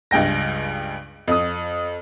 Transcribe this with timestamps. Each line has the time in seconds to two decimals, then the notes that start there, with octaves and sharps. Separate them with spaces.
0.11 C#2 G2 G5 A#6
1.28 F2 D#6